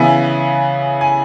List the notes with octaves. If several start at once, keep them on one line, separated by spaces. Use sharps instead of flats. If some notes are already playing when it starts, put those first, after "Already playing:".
Already playing: C#3 E3 B3 E5 G#5
G#5